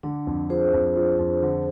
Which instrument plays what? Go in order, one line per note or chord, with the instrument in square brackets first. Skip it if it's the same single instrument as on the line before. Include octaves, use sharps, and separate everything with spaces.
[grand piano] D3 [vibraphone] D4
[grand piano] F2
[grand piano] F3 [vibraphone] G#4 C5
[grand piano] F2
F3
F2
D3